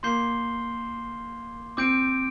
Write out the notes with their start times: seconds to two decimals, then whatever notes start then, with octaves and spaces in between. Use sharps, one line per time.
0.03 A#3 C6 G6 C7 G7
1.77 C4 D6 G6 D7